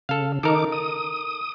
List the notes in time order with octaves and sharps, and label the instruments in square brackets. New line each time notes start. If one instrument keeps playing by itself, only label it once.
[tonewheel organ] C#3 [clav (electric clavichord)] A4 F5
[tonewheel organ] D#3 D#4 D6 [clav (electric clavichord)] A4 A#4
[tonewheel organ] D#6